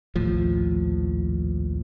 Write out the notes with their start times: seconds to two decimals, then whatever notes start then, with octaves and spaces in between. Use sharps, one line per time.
0.15 A#1 D#2 A2 F3